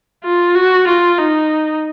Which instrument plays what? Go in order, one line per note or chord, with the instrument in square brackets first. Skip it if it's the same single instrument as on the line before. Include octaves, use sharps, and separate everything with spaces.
[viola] F4
F#4
F4
D#4